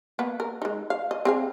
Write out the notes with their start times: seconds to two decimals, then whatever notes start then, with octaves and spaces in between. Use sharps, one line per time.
0.19 A#3 B3
0.40 A#4
0.62 G#3 D#4
0.90 F5
1.11 D#5
1.25 C4 G#4 F5